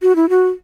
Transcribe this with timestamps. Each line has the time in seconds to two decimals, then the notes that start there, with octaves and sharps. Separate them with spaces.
0.02 F#4
0.16 E4
0.29 F#4